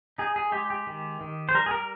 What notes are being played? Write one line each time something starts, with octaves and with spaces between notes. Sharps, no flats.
D#4 G#4
G#4
G#3 G4
G4
D#3
D#3
C5
G3 A#4
G#4
A#4